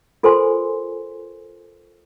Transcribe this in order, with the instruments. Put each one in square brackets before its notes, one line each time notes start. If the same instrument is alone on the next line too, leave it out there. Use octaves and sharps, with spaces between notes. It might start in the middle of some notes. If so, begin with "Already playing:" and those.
[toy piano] F4 A4 A#4 C5 G#5 C6